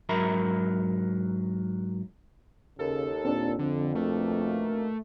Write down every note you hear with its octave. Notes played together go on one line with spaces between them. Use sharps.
G#2 F#3 A#4 E5 A#5 B5
D#2 C#3 A4
A#2 C4 D4 A4
F2 D3
B2 D#3 A3 A#3